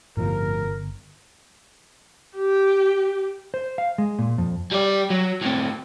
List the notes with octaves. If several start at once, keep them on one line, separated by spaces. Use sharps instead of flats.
G1 A2 C3 F3 A#4
G4
C5
F5
G#3
A#2
F2
G3 D5
F#3
A2 C4